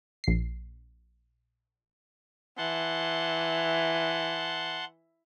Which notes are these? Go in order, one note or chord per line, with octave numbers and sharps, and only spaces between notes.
A#1 C7
E3 F#5 A5 C6